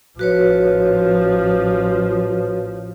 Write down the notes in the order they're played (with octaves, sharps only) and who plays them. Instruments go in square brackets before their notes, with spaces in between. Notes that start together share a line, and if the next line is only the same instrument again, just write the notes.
[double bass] A1 F3 [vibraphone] F#4 B4 C#5